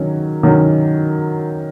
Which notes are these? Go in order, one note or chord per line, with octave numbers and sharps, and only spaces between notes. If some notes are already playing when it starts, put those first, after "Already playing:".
Already playing: D#3 F#3 C#4
D#3 F#3 C#4